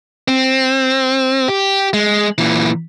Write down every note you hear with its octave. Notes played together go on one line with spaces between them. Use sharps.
C4
G4
G#3
A#2 E3